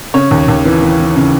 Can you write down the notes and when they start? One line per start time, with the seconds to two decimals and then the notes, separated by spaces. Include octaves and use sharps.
0.14 C#3 C#5
0.31 D#2
0.48 D#2
0.65 E3
0.82 E3
1.00 E3
1.16 C#3